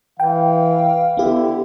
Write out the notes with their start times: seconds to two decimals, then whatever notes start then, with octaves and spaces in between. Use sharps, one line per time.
0.20 E3 F5 G5
1.17 D3 B3 E4 G4